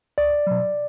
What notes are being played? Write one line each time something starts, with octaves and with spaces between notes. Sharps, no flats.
C#2 D5
B2 F#3